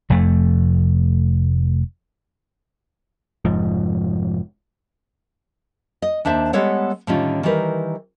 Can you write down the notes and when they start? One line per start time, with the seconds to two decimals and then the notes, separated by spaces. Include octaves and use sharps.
0.10 F1 F2 A3
3.45 F1 G#2 F3
6.02 D#5
6.25 D#2 D4 C5 E5
6.53 G3 G#3 B3 A4 C#5 F#5
7.07 A2 D3 D#3 G3 C#4 F4
7.43 D#3 E3 G3 A#4 B4